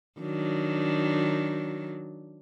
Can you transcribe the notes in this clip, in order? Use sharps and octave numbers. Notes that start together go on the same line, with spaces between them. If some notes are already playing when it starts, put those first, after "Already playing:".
D#3 F#3 D4